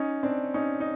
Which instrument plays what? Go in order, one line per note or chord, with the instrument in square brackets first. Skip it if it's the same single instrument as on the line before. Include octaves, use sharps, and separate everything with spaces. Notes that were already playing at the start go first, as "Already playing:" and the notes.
Already playing: [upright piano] C#4 D#4
C4 D4
C#4 D#4
D#4